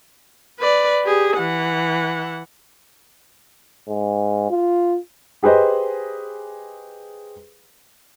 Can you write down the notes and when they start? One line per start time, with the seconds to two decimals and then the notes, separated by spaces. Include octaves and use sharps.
0.59 B4 D5
1.04 G4 G#4
1.37 E3 F#5
3.88 G#2
4.50 F4
5.43 G4 G#4 B4 C5 D#5